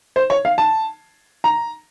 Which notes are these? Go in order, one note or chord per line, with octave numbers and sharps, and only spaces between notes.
C5
C#5
F5
A5
A#5